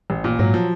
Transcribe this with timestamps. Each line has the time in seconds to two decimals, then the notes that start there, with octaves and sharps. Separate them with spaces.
0.10 A1
0.24 A#2
0.39 G#2 F#3
0.54 F3